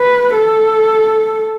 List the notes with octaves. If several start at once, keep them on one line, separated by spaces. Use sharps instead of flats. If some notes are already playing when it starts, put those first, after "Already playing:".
Already playing: B4
A4